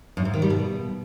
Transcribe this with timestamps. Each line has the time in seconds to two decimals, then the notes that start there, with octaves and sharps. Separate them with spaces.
0.17 F#2
0.25 G#2
0.34 D#3
0.42 G3
0.50 B2